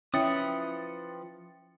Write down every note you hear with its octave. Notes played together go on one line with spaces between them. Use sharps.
F3 C#4 E4 B4 G5 D#6 A6 C#7